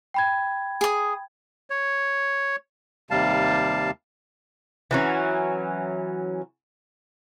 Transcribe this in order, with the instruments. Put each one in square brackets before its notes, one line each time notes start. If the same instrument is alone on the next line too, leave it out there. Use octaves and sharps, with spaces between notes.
[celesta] G5 B5 G#6
[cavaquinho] G#4 D#6
[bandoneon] C#5
D#2 C3 G3 F5 A5
[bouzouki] E3 F#3 C#4